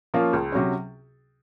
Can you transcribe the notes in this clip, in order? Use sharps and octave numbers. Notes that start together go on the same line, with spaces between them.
F3 A#3 C#4 F4
C#2
C3 F#3 C#4